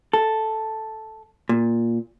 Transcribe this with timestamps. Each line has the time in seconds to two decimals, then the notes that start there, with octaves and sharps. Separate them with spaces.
0.13 A4
1.49 A#2